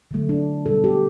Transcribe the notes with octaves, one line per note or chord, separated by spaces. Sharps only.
D3 F#3 A3
D4
B2 G3 A4
G4